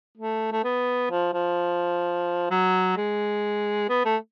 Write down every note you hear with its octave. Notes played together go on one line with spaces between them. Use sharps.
A3
A3
B3
F3
F3
F#3
G#3
B3
A3